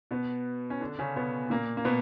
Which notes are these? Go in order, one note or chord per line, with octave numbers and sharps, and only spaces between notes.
B2 B3
C#4
D3 D4
C#3 C#4
B2 B3
A#2 A#3
A#3
B2 B3